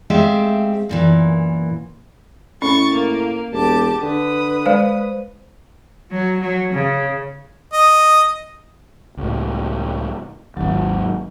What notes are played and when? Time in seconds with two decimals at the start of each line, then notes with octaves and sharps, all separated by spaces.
0.10 G#3 A3 C4 G4 E5 F5
0.89 F#2 A#2 E3
2.62 A2 C#4 C#6 A6
2.93 A#3
3.52 E1 G4 A5 D6
4.02 D3 B4 D#6
4.66 G#3 C5 D5 F5
6.11 F#3
6.40 F#3
6.73 C#3
7.73 D#5
9.17 C#2 A2
10.57 G#1 D#2 F#3